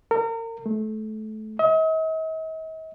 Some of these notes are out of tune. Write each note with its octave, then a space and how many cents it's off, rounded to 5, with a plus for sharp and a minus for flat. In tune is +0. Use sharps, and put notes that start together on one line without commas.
A#4 -35
A3 -25
D#5 +45